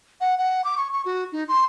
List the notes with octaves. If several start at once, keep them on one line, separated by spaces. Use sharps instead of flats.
F#5
F#5
D6
C#6
C#6
F#4
D#4
C6